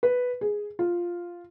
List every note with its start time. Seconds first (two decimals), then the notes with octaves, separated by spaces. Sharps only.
0.03 B4
0.41 G#4
0.79 F4